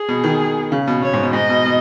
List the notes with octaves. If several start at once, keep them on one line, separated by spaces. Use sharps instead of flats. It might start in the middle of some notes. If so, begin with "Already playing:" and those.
Already playing: G#4
B2
D#3
C#3
B2
B2 C#5
G#2
B2
G#2 D#5
B2
B2